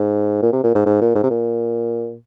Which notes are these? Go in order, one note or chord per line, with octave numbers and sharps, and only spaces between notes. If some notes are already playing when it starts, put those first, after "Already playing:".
Already playing: G#2
A#2
C3
A#2
G#2
G#2
A#2
G#2
C3
A#2